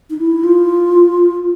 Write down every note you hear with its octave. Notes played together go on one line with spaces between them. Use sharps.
D#4
E4
F4